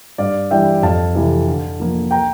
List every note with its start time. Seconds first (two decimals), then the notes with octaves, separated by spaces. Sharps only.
0.18 G2 D5 F5
0.51 E3 G3 D4 E5 G5
0.82 F2 F5 A5
1.15 C3 E3 A3
1.48 D3
1.80 F3 A#3
2.11 G5 A#5